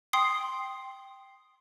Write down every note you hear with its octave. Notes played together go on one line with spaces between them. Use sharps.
G5 C6 D#6 C7